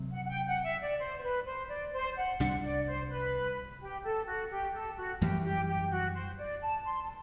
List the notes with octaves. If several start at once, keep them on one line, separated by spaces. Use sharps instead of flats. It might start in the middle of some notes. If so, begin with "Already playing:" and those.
Already playing: C3 F#3 C4
F#5
F#5
G5
F#5
E5
D5
C5
C5
B4
C5
D5
C5
F#5
C2 C3 G3 D4 F#5
D5
C5
B4
G4
A4
F#4
G4
A4
F#4
F#2 E3 G3 G4
G4
G4
F#4
C5
D5
A5
C6
A5